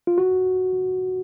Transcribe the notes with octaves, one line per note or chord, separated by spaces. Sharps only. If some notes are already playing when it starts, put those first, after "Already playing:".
F4
F#4